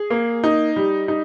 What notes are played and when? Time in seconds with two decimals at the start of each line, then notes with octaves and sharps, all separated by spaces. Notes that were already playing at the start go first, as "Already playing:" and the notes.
Already playing: G#4
0.10 A#3
0.44 D#4
0.76 G3
1.08 D#4